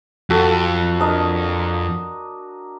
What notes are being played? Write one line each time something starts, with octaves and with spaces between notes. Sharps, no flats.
F2 F#4 A4
D4 A#4 D#5